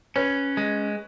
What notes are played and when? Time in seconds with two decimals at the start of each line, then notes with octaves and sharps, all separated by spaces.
0.16 C#4 B4 C#5
0.57 G#3